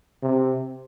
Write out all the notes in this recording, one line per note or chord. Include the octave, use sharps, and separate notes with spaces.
C3